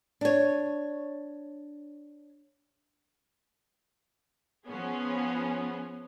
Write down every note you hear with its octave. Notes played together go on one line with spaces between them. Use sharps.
D4 C#5
F3 B3 C#4 G#4